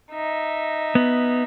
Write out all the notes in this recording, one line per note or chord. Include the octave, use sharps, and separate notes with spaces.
D#4 E5
B3